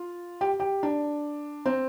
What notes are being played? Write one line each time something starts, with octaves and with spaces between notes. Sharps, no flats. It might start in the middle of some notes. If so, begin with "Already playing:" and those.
Already playing: F4
G4
G4
D4
C4